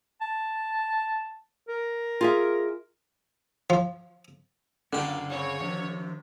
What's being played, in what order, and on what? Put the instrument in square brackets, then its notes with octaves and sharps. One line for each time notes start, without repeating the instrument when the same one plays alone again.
[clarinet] A5
A#4
[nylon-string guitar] F4 G#4 E5
[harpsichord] F3
[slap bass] F#1 C#4 [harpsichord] D3 G5 [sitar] A#3 D4 F4
[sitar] C#3 C4 [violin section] C#5
[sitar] F#2 C3 [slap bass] D#3 F3